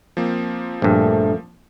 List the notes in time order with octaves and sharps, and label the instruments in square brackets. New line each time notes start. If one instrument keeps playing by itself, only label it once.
[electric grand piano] F3 A#3 C4
[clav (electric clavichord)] A#1 G2 [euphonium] A3